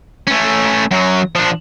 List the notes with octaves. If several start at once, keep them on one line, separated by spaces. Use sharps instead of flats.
A3 C#4
F#2 F#3
F3 D4